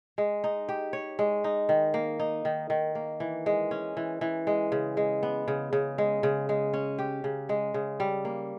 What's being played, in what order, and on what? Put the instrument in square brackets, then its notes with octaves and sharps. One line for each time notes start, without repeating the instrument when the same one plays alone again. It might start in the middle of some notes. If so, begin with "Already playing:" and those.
[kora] G#3
D#4
G4
C#5
G#3
D#4
D#3
A#3
D#4
D#3
D#3
A#3
E3
G#3
C#4
E3
E3
G#3
C#3
G#3
B3
C#3
C#3
G#3
C#3
G#3
C#4
G4
C#3
G#3
C#3
G3
A#3